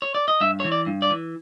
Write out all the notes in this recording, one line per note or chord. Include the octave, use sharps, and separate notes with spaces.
C#5
D5
D#5
G2 E5
E3 C#5
D5
G2
D5
E3